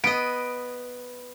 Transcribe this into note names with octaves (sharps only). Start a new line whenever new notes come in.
B3 D#5 D7